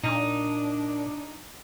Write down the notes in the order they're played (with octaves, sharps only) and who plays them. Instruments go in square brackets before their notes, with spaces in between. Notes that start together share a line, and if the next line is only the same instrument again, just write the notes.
[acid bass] A#2 [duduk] D4 [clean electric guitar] D#4